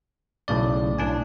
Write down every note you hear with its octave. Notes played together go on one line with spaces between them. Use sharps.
B1 A2 C#3 D5
B1 A2 D4 G#5